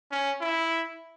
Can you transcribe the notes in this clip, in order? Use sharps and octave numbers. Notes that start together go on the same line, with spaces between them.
C#4
E4